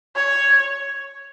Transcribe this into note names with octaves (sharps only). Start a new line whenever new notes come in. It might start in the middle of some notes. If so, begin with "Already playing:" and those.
C#5